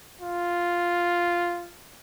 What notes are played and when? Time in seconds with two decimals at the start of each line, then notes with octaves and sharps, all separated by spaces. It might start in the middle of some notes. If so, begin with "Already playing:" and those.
0.21 F4